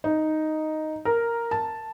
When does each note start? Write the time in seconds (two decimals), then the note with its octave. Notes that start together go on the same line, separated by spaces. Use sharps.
0.04 D#4
1.05 A#4
1.51 A5